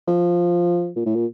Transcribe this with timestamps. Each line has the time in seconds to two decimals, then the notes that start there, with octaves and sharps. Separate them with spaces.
0.08 F3
0.96 A#2
1.06 A2
1.16 A#2